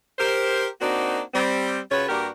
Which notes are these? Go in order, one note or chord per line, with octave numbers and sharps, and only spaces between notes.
G4 A#4 C5
A#3 C4 D4 D#4 F#4
G3 C4
C#3 F4 F#4 B4 C#5
G2 A#3 D4 F#4 G4 A#4